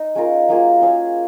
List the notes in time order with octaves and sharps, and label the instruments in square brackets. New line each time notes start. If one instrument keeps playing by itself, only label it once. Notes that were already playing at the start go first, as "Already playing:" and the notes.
Already playing: [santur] D#4
G#3 C#4 F4 A#4
F#3 A#3 F4 G#4
C#4 G#4 C#5 F5